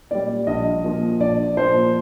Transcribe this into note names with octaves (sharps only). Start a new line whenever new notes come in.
A#2 G3 D5
A#1 D#5
A#2 F3
A#1 D5
A#2 F3 C5